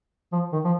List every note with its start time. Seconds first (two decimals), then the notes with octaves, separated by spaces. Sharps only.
0.32 F3
0.52 D#3
0.64 F3